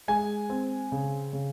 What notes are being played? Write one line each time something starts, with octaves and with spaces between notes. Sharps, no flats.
G#3 G#5
C4
C#3
C#3